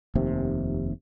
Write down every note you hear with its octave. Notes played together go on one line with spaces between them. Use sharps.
F1 D#2 C3